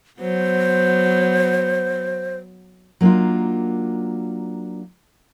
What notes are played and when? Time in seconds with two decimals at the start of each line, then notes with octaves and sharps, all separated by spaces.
0.20 F#3 B3 C5
3.01 F#3 A#3 D4 D#4 F4